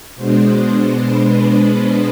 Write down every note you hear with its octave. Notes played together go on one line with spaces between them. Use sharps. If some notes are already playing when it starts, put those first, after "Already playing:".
B2 G#3 B3 D4 C5
B4
C5